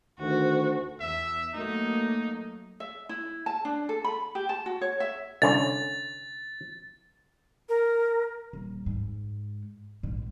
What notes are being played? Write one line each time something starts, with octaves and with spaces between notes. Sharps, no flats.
D2 D#3 F#4 C5
E2 E5
F#3 A3 A#3 D#4
E5
E4
A5
D4
A4
B5
G4
A5
F#4
C#5
E5
C2 D3 C#4 A6
A#4
D#1
G#2
A#1 G#2